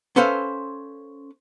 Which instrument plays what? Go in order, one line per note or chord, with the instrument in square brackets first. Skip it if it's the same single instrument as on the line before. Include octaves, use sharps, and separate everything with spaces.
[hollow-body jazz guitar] C#4 A4 B4 C5 E5 F5